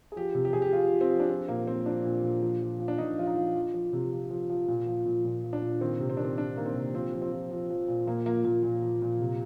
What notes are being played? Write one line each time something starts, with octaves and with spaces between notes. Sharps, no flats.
G#4
F3 G4
C3
G4
C3 G#4
G4
F3 F4
F3
C4
F3
D4
F3 C4
A#2 A#3
F3 C4
F3 D4
A#2
A#2
F3
F3
F3
D4
A#2 D#4
F3 F4
D#4
F3
F3
F3
C3
F3
F3
F3
A#2
F3
A#2
A#2
F3
D4
A#2
D#3 C4
C3
C4
D#3 D4
C4
D#3 D4
D#3 A#3
C4
C3
F3 C4
F3
C4
F3
F3
F3
A#2
A#2 A#3
F3 A#3
A#2 A#3
A#2
F3
A#2
C3